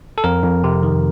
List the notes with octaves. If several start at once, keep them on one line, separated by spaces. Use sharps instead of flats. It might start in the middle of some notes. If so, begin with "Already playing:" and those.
A4
F2 A#4
F2
C3
D#3